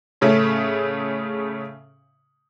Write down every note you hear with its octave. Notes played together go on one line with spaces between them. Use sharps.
A2 C#3 A3 C#4